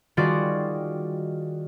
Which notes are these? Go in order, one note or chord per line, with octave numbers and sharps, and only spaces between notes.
D#3 G3 F4 F#4 G#4 D5